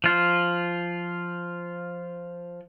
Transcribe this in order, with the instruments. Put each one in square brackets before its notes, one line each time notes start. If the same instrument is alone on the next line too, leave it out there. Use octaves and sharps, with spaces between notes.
[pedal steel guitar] F3 F4